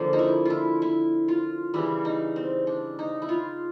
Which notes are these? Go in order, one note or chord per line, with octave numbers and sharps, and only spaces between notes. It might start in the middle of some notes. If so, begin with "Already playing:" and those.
Already playing: D3 F3 A#3
D#4
E4
E4 F4
E4
F4
C#3 E3 G3 E4
D#4
C4
D4
D#4
E4
F4